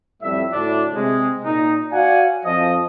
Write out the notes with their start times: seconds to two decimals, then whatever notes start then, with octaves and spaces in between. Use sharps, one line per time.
0.23 F2 A2 G3 E5
0.53 D2 A2 D4
0.94 C3 G#3
1.45 A#2 D#4
1.92 F#4 C#5 D5 F5 F#5 G#5
2.45 F2 F3 D#5